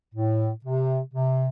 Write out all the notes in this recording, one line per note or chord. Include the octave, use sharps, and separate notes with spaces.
A2
C3
C3